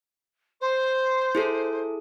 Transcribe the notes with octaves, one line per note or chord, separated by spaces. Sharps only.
C5
E4 G#4 A4